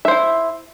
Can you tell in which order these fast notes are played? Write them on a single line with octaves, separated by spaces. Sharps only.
E5 C5 E4